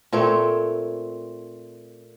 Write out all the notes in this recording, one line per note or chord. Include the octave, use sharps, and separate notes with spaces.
A#2 A3 C4 C#5